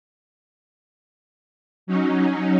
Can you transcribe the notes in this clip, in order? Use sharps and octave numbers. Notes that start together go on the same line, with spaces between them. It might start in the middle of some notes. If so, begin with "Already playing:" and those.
F#3 C#4 D#4